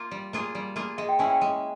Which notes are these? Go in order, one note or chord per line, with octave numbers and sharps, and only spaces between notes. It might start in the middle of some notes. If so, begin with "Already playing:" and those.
Already playing: A#3 F4
G3
A#3 F4 G#4
G3
A#3 F4 G#4
G#3 E5
G5
C#4 E4 G#4 G#5
G5
G#3